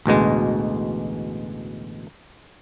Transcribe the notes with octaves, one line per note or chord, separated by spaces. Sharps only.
A1 D2 B2 G#3